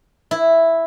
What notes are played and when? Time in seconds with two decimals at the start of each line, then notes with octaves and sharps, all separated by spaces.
0.31 E4